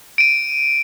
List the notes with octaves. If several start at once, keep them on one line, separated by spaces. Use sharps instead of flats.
D7 D#7